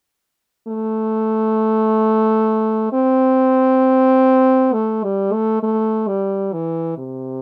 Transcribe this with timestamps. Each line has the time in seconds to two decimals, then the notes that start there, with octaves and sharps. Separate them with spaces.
0.67 A3
2.93 C4
4.73 A3
5.03 G3
5.33 A3
5.63 A3
6.07 G3
6.53 E3
6.97 C3